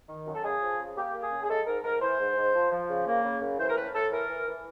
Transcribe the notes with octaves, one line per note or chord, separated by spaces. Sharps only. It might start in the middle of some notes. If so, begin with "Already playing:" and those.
D#3
F#2
A4
C#3 G#4
F3
C#3
A#3 G4
A#3 G4
G#4
C#3
G#4
G#3 A4
G#2 A#4
G#2 A#4
E3 C5
G#2
G#2
F3
F3
C#3
A#3
C#3
F#2
E3 C5
A#4
A2 B4
A2 A4
E3 A#4
E3
E3